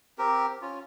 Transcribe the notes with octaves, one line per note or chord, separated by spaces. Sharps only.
C4 G4 A#4
C#4 F4